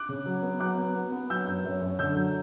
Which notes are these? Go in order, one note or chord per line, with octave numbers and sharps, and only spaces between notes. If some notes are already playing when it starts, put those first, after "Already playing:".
Already playing: D6 F#6
C#3
F#3
B3
F#3 D6 F#6
B3
B3
B3
F#3 E6 G6
F#2
F#2
F#2
D3 E6 G6
F#3